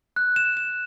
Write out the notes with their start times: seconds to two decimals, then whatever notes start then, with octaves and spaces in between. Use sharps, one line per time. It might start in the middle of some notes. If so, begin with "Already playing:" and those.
0.16 F#6
0.36 E7
0.57 E7